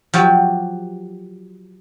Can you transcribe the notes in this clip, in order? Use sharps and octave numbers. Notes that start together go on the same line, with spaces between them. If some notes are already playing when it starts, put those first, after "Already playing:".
F3 F#3 F#4 G4